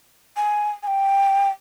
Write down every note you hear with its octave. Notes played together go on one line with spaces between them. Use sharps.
G#5
G#5
G5